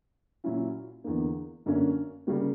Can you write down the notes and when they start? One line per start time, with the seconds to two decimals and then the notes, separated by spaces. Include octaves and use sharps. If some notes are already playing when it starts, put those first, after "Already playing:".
0.44 A#2 F#3 C#4 E4
1.04 E2 D3 A#3
1.66 F#2 D3 A#3 C#4
2.27 C#3 G3 A#3